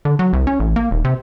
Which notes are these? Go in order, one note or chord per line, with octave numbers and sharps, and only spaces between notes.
D3
F#3
C2
C#4
A1
A#3
D#1
C3